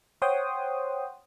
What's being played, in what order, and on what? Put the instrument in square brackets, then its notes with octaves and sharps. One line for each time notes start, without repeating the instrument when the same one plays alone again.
[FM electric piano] C5 C#5 F#5 G5 C6 D#6